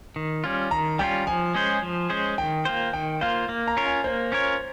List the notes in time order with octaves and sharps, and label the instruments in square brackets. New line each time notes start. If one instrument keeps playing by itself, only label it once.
[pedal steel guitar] D#3
G3 C#4 F4
[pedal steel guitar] D#3 [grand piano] A#5
[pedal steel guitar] G3 C#4 F4 [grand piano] G5
[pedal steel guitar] F3 [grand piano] G#5
[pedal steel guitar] G#3 C#4 G#4 C5
F3
G#3 C#4 G#4 C5
[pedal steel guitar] D#3 [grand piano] G5
[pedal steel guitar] A#3 F4 C5
[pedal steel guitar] D#3 [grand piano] G5
[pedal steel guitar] A#3 F4 C5 [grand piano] F5
[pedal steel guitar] A#3
[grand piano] A#5
[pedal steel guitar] C#4 F4 A#4 C#5
[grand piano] G#5
[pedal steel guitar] A#3 [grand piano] C5
[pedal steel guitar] C#4 F4 A#4 C#5